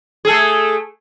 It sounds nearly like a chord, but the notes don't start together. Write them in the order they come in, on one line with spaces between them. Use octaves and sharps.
G#4 A4 A3